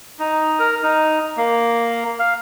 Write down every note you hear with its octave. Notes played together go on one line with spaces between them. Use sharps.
D#4
A#4
D#4
A#3
F5